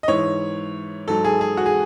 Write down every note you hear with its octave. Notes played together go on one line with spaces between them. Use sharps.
D#5
G#2 E3 C#5
G#2 F#3 A4
G#4
G#4
F#4
G#4